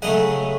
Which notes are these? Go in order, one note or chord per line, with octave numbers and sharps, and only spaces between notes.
C#3 F#3 A3 D#5 F#5